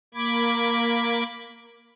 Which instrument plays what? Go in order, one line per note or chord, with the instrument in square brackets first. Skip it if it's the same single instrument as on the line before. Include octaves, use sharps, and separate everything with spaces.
[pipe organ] A#3 B5 D6 G#6